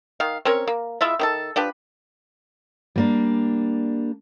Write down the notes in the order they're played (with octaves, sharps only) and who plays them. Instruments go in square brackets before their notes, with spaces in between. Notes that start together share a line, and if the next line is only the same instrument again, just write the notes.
[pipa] D#3 F5
C4 C#4 A#4 C#5
A#3
G#3 E4 F4 E5
D#3 G4 A4
F3 D4 G4 B4
[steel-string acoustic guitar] G3 A#3 D4